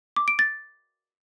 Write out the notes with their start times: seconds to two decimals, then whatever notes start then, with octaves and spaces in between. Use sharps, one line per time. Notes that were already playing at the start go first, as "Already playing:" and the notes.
0.16 D6
0.28 D7
0.39 A6